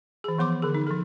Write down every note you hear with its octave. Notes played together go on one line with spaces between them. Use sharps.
E3 G#4
F3 B3 C6 D6
D3 G#4
D#4
F3 A4